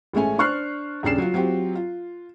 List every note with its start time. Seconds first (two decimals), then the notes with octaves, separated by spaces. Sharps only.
0.13 A1 G#3 A3 C#4 G#5
0.38 D4 C5 C#6 F6 F#6 C7
1.03 D#1 C#3 D4 C7 E7
1.18 F#3 F4
1.34 F#3 C4 F4 G4
1.75 F4